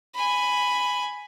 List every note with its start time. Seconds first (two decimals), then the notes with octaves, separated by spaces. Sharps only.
0.15 G#5 B5